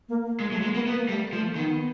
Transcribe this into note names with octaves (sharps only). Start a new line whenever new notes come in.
A#3
A#3
G#3
F#3 A3
G#3 A#3
A#3 B3
A#3 B3
A#3
G3 A3
F3 A3
A#3
D#3 B3
B3